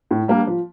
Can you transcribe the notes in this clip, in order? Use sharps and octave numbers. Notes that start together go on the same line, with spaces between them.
A2
G3 A#3 D4
F3